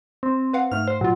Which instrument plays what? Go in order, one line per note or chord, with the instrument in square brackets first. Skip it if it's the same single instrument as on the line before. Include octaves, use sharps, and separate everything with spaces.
[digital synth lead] C4
[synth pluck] B4 F5 F#5
[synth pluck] G#2 A3 [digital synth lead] F6
[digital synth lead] C5
[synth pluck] A#2 F4 [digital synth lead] F#3